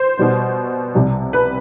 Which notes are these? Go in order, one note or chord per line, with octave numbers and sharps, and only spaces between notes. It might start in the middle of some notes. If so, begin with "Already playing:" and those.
Already playing: C5
B2 G3 B3
C2 C3 G3
B4